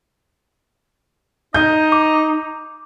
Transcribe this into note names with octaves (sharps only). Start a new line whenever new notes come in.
D#4 D#5 G6
D6